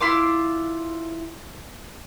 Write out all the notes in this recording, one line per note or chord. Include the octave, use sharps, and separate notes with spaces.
E4 F4 C6 D6